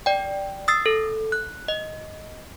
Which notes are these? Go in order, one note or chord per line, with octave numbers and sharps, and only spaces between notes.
D5 G5
D#6 E6 A6 C7
A4
F#6
D#5